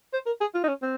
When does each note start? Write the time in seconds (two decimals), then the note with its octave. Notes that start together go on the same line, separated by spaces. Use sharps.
0.13 C5
0.26 A#4
0.40 G#4
0.54 F4
0.63 D#4
0.68 C#4
0.82 C4